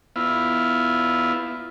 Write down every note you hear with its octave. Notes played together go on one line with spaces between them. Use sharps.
B3 E4 F4